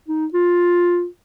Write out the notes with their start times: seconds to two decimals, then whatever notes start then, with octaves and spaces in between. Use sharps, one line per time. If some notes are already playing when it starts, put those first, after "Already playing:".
0.08 D#4
0.33 F4